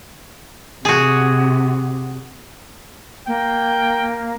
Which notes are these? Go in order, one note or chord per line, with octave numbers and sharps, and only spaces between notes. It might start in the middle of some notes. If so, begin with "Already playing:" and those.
C3 F#4 G#4
A#3 G5